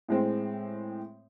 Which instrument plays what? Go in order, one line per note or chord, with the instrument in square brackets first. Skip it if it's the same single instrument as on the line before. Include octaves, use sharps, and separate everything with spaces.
[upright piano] A2 G#3 C4